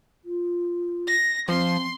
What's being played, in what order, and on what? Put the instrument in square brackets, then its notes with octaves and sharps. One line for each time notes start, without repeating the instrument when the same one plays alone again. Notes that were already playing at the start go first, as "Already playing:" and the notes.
[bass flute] F4
[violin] A#6
[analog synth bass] F3 [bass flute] C4 [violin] C6